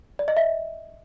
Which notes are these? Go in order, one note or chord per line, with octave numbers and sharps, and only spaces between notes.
D5
D#5
E5